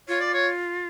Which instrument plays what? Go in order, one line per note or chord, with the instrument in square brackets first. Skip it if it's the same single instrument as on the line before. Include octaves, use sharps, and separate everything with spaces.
[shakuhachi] F4 [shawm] C#5
[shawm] D5
C#5